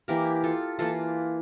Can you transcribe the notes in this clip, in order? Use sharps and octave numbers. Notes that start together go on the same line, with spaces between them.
E3 A#3 G4 A#4
F4 A4
E3 A#3 F4 A4